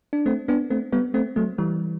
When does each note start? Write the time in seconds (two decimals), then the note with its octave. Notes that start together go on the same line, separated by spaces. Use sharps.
0.13 D4
0.26 A3 C4
0.48 B3 D4
0.70 A3 C4
0.92 G3 B3
1.14 A3 C4
1.36 F#3 A3
1.58 E3 G3